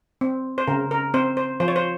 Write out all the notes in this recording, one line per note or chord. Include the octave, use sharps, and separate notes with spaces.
C4
C5
C#3 A#4
A#4
C4 C5
C5
F3 C5
C#5
C5